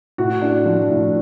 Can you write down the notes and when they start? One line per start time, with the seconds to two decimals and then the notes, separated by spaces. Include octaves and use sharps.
0.18 A2 F#4
0.42 D4
0.65 F3
0.90 A2